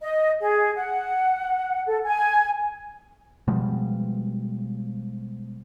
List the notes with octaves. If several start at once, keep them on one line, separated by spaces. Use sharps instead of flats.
D#5
G#4
F#5
A4
G#5
B2 F3 G3 G#3